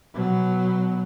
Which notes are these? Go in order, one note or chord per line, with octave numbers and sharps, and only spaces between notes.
B2 F#3